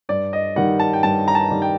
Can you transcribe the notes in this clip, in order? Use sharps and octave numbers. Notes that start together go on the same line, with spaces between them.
G2 D5
D#5
D#3 G3 F#5
A5
G5
G2 A5
A#5
A5
D#3 G3
G5